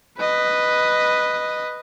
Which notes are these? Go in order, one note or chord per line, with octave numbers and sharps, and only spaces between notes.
B4 D#5